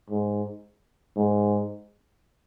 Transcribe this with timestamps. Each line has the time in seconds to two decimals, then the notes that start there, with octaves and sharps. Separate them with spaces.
0.10 G#2
1.16 G#2